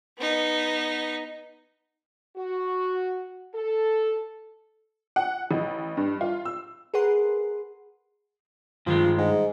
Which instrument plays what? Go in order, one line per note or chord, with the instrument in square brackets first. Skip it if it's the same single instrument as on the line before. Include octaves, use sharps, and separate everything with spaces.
[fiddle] B3 D#4
[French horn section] F#4
A4
[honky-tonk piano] F#5
A1
G2
F4
E6
[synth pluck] G#4 A#4 B4 F#5 C6
[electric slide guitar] G2 D#3 G#3 [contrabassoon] F3
[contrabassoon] G#2